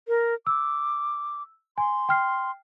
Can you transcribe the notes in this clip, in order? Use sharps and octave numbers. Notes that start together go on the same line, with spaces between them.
A#4
D6 E6
G#5 C6
G5 F6 C7